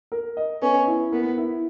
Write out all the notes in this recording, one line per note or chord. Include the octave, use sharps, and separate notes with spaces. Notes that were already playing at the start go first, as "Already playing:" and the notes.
A#4
D#5
B3 C#4
E4
B3 A#4
E4